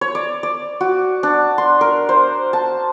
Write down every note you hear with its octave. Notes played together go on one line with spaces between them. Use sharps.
C#5
D5
D5
F#4
D4
C6
A#4
C5
A5